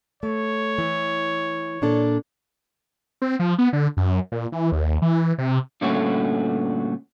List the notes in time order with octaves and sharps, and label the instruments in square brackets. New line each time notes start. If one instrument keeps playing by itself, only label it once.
[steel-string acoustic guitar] A3 [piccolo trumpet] C#5
[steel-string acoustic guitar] E3
A#2 D4 A4
[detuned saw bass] C4
F3
B3
D3
F#2
A#2
E3
D#2
E3
C3
[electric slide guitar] G2 A#2 D3 A3 C#4 F#4